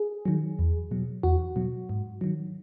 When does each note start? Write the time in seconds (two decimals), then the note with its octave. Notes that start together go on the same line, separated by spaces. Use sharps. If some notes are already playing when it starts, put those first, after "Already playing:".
Already playing: G#4
0.25 D#3 F#3
0.59 E2
0.91 B2 F#3
1.23 E2 F#4
1.56 B2 F#3
1.89 G#2
2.21 D#3 F#3